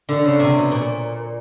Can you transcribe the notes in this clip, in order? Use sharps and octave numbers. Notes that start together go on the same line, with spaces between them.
D3
C#3
C3
B2
A#2